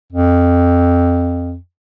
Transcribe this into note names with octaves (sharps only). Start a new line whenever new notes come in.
F2